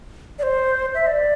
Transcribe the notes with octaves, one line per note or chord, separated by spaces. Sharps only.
D5
C5
E5
D5